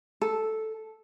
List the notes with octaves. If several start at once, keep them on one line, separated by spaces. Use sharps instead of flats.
A4